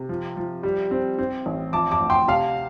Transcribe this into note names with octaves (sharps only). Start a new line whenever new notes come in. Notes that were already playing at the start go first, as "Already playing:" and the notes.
Already playing: C3
F3
F3
G3
C4
C4
A1
F3 A5 D6
A5 D6
D2
G5 C6
C3 F5 A5